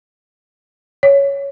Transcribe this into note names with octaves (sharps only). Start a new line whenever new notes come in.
C#5